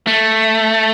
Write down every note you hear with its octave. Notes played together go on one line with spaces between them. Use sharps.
A3